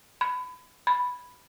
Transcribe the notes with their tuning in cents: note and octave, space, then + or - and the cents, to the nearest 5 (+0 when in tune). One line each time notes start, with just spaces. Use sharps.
B5 +25
B5 +0